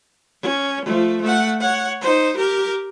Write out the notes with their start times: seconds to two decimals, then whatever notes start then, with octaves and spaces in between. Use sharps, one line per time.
0.42 C#4
0.85 F3 A3
1.21 A3 F#5
1.60 C#5 F#5
2.01 D#4 C5
2.36 G4 A#4